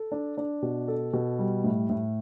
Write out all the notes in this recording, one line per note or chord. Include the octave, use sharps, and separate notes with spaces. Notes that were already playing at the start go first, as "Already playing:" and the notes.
Already playing: A4
D4
D4
B2
A4
B2
G3
A2
A2